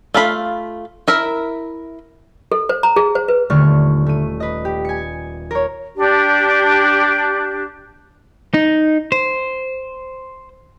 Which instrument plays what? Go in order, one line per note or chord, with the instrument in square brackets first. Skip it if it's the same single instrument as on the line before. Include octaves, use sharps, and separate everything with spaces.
[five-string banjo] A3 F4 F5 B5
E4 A#4 E5
[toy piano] A4
C5
A#5
G#4
C5
B4
[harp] D#1 D3 A3 C#6 F6
A3 D#7
B4 D#5
G4
G#5 C#7
A#4 C#5
[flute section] D4 G4
[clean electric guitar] D#4
C5